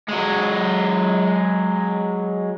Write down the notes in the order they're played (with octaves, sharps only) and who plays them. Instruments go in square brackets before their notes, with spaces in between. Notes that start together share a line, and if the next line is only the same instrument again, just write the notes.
[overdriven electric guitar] F#3 G#3